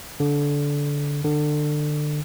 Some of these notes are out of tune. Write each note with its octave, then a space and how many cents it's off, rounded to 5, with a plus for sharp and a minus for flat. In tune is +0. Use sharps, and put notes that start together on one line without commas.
D3 -20
D3 +25